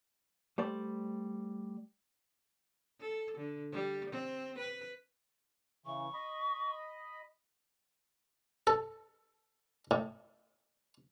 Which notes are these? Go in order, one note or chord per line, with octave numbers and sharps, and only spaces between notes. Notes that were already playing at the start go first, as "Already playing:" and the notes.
G3 A3 C5 D5
A4
D3
G3
C4
B4
C#3 E3 C#6
D#5 B5
A4
A2